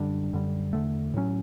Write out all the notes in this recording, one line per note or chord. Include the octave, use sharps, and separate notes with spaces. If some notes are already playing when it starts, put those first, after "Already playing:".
Already playing: F#2 D3 G3 D4
F#2 D3 G3
E2 D3 A3
A2 F#3 C#4